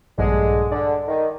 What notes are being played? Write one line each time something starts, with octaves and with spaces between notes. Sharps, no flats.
A#1 G2 D3 G#3
D3 D5
D#3